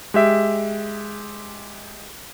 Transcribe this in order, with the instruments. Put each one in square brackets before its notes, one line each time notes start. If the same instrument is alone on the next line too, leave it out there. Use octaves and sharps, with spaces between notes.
[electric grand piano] G#3 G4 E5